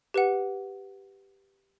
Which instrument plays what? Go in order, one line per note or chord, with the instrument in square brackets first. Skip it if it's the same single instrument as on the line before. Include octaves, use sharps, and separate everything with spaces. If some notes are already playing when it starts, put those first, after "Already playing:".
[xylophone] G4 B4 F#5